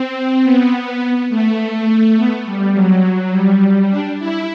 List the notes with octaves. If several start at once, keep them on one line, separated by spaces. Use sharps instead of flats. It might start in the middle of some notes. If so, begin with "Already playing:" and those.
Already playing: C4
B3
B3
A3
A3
B3
G3
F#3
G3
D4
E4